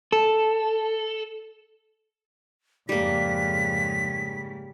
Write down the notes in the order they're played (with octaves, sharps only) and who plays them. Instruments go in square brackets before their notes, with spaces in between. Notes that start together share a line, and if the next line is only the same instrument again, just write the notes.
[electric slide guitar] A4
[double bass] F2 [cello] G#2 C#3 [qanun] G3 A#3 [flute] B6